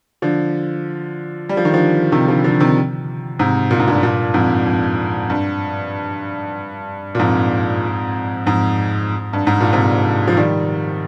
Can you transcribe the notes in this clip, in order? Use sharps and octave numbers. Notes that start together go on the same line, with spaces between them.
D3 F3
G3
F3
D#3
D3 F3
C3 D#3
D3 F3
D3 F3
C3 D#3
G#2 C3
A#2
G#2
G2 A#2
G2 A#2
F2 G#2
F2
G2
A#2
F2 G#2
F2 G#2
G2
G#2
A#2
G#2 C3
F3
D#3 G3